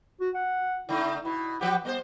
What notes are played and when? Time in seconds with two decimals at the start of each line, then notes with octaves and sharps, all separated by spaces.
0.21 F#4
0.35 F#5
0.89 C#3 A3 D#4 E4
1.25 B2 E4
1.61 F3 B3 G4 F#5
1.85 G3 B3 A#4 C5